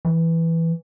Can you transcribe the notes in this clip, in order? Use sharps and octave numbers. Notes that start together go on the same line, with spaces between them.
E3